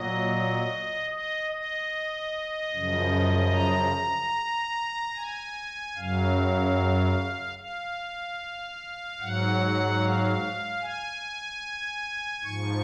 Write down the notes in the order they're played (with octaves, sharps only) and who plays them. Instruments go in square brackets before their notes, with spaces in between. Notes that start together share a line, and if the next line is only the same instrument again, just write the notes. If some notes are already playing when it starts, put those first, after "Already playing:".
Already playing: [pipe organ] A#2 F#3 D#5
D#5
D#5
F#2 C#3 F3
A#5
G#5
F#2 C#3 F#3 F5
F5
G#2 F#3 F#5
F5
G#5
G#2 F3 C#6